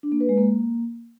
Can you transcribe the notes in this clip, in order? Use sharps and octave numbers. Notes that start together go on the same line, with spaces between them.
D4
A#3
B4
G#3
A#3